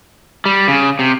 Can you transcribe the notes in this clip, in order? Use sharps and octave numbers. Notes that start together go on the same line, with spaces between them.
G3
C#3
C3